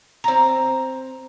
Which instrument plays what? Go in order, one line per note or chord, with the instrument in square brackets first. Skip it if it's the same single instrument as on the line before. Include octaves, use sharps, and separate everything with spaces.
[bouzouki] C4 A#5